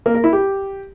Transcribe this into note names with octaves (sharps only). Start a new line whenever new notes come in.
A#3
A#4
E4
G4